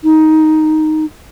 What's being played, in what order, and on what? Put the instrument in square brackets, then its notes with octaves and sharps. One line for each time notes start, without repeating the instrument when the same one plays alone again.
[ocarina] D#4